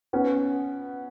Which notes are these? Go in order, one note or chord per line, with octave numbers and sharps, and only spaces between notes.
B3 C#4